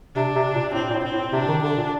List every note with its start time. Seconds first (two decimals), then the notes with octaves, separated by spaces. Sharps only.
0.15 C3 D4
0.35 C3
0.55 A#2
0.74 A2 C4
0.90 A#2
0.94 A2
1.04 C4
1.13 A2
1.33 C3 D4
1.48 D#3
1.63 D3 D4
1.78 A#2